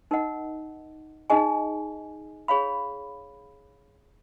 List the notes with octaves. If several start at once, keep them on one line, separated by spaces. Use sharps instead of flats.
D#4 A#4 D#5 F#5
D#4 G#4 D#5 G#5
G#4 C#5 F5 B5